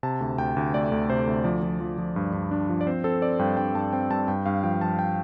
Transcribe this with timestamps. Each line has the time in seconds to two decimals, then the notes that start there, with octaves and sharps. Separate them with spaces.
0.03 C3 A5
0.21 D2
0.38 D2 G5
0.56 D2
0.74 A3 D5
0.92 D2
1.09 C3 C5
1.27 D2
1.44 F3 D5
1.63 F3
1.81 F3
1.98 F3
2.16 G2
2.33 G2
2.51 D4
2.69 F3
2.81 D5
2.87 C4 C5
3.04 C4 A4
3.22 C4 D5
3.39 G2 G5
3.57 G2 G5
3.75 G2 A5
3.93 C4 G5
4.10 G2 A5
4.28 G2 G5
4.46 G2 F5
4.63 F3 G5
4.81 F3 A5
4.99 G5